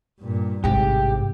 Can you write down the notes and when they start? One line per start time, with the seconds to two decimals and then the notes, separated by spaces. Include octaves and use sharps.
0.21 G2 A#2
0.64 A1 G#2 C3 G4